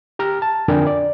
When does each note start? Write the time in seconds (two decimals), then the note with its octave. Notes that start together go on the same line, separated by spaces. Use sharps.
0.19 G4 A#5 F6
0.42 A5
0.68 F2 D3 D4 A#4 G5 G#5
0.87 D5